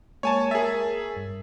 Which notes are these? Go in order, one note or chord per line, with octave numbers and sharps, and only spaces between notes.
G#3 A#3 C#5 G#5 A5
G#4 A#4 E5 G#5 A6
G2